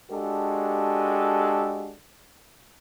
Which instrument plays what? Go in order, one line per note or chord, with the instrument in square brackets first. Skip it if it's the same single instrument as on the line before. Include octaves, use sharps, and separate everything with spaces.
[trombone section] G#3 D4 F#4 G4 A4